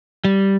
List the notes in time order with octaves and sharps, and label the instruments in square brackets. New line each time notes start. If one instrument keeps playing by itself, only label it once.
[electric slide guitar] G3